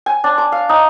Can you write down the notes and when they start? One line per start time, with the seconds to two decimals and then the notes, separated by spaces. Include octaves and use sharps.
0.06 G#5
0.24 D4
0.38 D6
0.52 F5
0.69 D#4